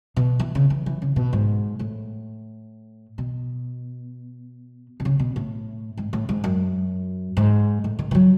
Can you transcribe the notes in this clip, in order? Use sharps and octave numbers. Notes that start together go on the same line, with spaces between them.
B2
E3
C#3
E3
E3
C#3
B2
G#2
A2
B2
B2
C#3
B2
A2
G#2
A2
G#2
F#2
G#2
A2
D#3
E3
F#3